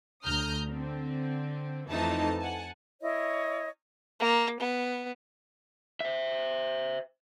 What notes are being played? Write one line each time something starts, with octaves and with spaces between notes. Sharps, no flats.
D2 A#5 D#6 F6 G6
D3 C4
F2 E3 A3 D#4 A5
F#5 G#5 A5
E4 C#5 D#5
A#3
B3
C5 E5